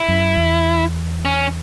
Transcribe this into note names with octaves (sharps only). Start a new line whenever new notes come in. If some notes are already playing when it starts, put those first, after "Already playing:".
Already playing: E4
F#2
E2
C#4